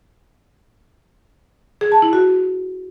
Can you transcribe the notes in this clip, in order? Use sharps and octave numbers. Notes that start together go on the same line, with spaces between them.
G#4
A5
E4
F#4